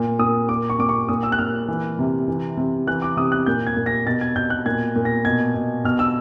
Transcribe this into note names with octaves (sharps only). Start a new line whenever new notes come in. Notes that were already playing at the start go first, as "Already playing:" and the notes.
Already playing: A#2
A#2 D#6
A#2 D6
C#6
A#2 D6
C#6
A#2 D#6
E6
F#6
A#2 F6
E3
C3
E3
C3
E3 F#6
D6
C3 D#6
F#6
A#2 G6
G#6
A#2
A#6
B2 A6
G#6
B2 G6
F#6
A#2 G#6
A#2
A#6
B2 G#6
B2
B2 F6
E6